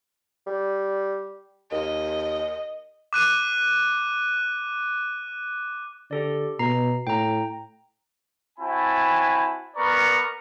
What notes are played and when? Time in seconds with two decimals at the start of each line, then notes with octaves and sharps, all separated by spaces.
0.47 G3
1.72 D#2 D#5
3.13 D6 F#6 D#7
6.11 D3 G4 A4 D5
6.59 B2 A#5 C7
7.07 A2 G5 A#5
8.59 C4 E4 F#4 G#5 A5 B5
9.76 B3 A#4 B4 D5 A#5 C#6